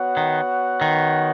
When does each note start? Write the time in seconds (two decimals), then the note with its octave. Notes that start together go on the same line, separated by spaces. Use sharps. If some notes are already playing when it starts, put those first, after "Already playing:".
Already playing: B3 F#4 C#5 F#5
0.17 D#3
0.81 D#3